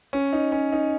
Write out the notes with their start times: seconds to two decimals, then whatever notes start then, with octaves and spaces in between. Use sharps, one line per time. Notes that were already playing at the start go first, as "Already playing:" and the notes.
0.13 C#4
0.33 D#4
0.52 C#4
0.72 D#4